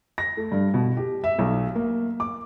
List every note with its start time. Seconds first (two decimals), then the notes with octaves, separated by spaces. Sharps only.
0.18 A#6
0.37 A3
0.52 G2
0.74 B2
0.97 G4
1.24 E5
1.39 B1
1.75 A#3
2.20 D6